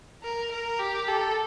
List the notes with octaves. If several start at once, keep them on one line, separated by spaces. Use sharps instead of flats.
A#4
A#4
G4
A4